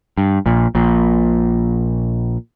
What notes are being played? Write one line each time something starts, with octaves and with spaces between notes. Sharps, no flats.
G2
A#1 A#2
A#1 A#2